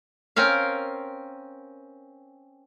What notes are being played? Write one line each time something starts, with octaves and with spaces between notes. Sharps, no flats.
C4 C#4 A#4 F5